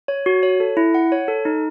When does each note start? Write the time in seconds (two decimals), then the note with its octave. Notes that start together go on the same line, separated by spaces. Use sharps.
0.08 C#5
0.26 F#4
0.43 C#5
0.60 A4
0.77 E4
0.95 F#5
1.12 C#5
1.28 A4
1.45 D#4